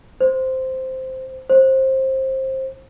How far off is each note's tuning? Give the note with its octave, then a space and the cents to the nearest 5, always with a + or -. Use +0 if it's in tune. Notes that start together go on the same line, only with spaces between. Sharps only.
C5 -5
C5 +20